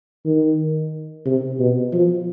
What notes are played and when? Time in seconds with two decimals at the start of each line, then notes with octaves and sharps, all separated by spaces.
0.25 D#3
1.26 C3
1.59 B2
1.93 F3